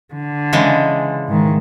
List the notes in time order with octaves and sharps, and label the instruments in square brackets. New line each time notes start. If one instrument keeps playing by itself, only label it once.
[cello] D3
[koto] C#3 E3 G#3
[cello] G#2 D#3